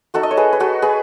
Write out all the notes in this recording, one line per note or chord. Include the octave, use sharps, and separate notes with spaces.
A3 D#4 F#4 A4
D#5
C#5
G#4 B4
B4
F#4 A4
G#4 B4